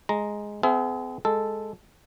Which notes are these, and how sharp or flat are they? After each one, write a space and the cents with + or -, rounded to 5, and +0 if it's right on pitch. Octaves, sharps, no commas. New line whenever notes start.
G#3 +0 A#5 +0
C4 -45 G#4 +30 E5 +20
G#3 +0 A4 +0